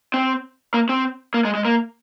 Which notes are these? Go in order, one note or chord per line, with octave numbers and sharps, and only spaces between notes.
C4
A#3
C4
A#3
G#3
G#3
A#3